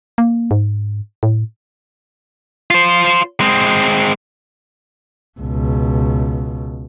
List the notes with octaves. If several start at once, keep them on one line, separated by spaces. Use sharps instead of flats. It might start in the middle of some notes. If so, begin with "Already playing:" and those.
A#3
G#2
A2
F4 C5
G#3 C4
C#2 B2